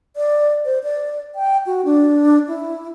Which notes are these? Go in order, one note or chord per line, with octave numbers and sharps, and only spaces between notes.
D5
C5
D5
G5
F#4
D4
E4